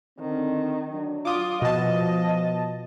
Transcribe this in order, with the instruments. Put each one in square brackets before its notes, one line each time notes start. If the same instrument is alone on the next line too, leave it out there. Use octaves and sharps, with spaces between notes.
[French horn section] D3 C4 [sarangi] D#3
[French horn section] F#3 D4
[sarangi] F4 [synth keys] D6 D#6
[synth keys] B2 A5 [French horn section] F3 [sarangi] D#5